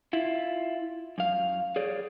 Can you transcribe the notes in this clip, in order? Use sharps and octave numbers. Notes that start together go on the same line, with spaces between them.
E4 F4
F#2 F5
G#4 C#5 D5